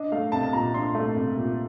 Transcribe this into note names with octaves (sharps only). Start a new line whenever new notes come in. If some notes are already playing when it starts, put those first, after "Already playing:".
Already playing: D4 D#5
A3 F5
C2 A5
A5
A#2 A#5
D4 C6
A3
C2
A#2